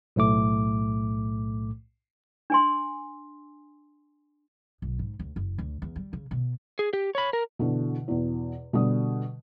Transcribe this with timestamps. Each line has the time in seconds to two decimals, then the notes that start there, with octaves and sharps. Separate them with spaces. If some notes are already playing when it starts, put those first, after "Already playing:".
0.16 B1 A2 A3 D6
2.50 D4 G#5 C6
4.82 B1
4.99 G#2
5.19 D2
5.36 F#1
5.58 D2
5.82 E2
5.96 G3
6.13 C#3
6.31 B2
6.79 G#4
6.93 G4
7.15 C#5 B5
7.33 A#4
7.59 B2 D3 E3
8.08 E2 B2
8.73 B2 D3 G3 D#6